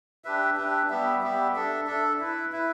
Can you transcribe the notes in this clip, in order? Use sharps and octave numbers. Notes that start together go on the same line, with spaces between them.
D4 G4 B4 E5
D4 G4 B4 E5
G3 B3 G4 E5
G3 B3 G4 E5
D4 A4 E5
D4 A4 E5
E4 B4 E5
E4 B4 E5